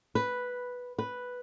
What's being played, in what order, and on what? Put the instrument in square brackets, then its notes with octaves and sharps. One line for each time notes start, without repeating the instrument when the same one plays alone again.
[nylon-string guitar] B4
B4